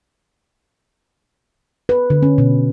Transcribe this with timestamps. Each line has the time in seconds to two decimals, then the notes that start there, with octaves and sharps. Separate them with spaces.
1.89 B4
2.10 D3
2.23 C#4
2.38 B2